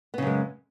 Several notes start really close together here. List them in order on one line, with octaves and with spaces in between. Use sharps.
B3 C#3 F#2 G#3